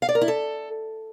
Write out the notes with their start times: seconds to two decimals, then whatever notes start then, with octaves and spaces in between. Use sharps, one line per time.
0.02 F5
0.09 D5
0.15 A#4
0.21 E4
0.28 A4